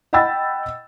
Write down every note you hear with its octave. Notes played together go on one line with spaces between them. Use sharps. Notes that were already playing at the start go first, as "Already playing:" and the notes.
D#5 F#5 G5 B5 E6 A6